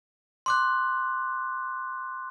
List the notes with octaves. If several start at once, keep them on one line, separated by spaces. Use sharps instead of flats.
C6 D6 F#6